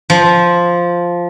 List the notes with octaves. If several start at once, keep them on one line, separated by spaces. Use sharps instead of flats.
F3